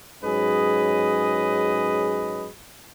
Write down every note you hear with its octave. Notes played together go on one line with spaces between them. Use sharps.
G#2 F#3 C#4 G#4 B4 D#5